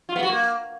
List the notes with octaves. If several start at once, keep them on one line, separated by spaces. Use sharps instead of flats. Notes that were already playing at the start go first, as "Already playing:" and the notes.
F4
B3
F#4
A#3